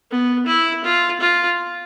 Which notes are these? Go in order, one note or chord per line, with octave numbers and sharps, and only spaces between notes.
B3
E4
F4
F4